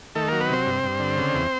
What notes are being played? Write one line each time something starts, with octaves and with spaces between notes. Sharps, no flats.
D#3 A3 A4
F#3 A#3 A#4
B3 B4
C3 C4 C5
G2
G2
D3
C#3
E2